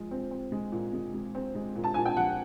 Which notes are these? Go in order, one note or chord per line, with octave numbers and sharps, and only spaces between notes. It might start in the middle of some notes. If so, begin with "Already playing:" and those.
Already playing: F3 G#3
C4
C4
G#3
A#2
G#3
G#3
C4
G#3
A#2
A5
A#2 G#5
G5
F3 F#5